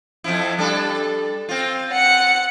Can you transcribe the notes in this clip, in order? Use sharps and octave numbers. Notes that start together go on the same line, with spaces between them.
F2 F3 E4
G3 D4 A4
C4 F4
F#5 C#7